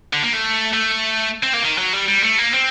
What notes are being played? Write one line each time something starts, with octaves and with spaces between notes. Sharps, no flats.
D3
A#3
A3
A3
C4
A#3
D#3
F#3
G3
G3
A3
A#3
C4